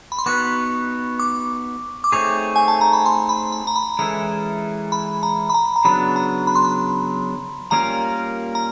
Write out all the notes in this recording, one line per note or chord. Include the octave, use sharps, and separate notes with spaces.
B5
C6
B3 D#4 F#4 B4 C#6
D6
D6
A3 C4 D#4 G#4 C#5 C#6
G#5
A5
A#5
B5
C6
B5
B5
A#5
B5
E3 G#3 C#4 E4 A4 A#5
B5
A#5
B5
A#5
A#5
C#3 F#3 B3 D4 B5
A#5
B5
C6
B5
G3 A#3 C#4 F4 A#4 A#5
A#5